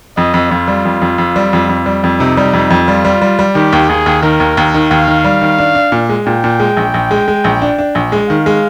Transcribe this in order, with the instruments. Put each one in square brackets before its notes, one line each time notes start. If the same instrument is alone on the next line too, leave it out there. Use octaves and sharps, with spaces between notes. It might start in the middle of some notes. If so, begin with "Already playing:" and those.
[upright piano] F2 [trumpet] D#5
[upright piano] F2
[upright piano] F2 [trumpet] F4
[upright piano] G3
F2
F2
F2
G3
F2
F2
G3
F2
[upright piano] C3 [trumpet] D#4
[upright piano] G3
F2
F2
[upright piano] G3 [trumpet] F4
[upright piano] G3
G3
G3
[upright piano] D#3 [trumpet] G4
[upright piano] D#2
[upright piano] D#2 [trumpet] G#4
[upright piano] D#2
[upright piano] D#3 [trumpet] A#4
[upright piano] D#2
D#2
D#3
[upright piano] D#2 [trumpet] F5
[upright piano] D#3
G3
D#3
D4
D4
A#2
G#3
[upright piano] A#2 [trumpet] G5
[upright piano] A#2
G#3
A#1
A#1
G#3
G#3
A#1
D4
D4
A#1
G#3
[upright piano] D#3 [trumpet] F5
[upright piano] G#3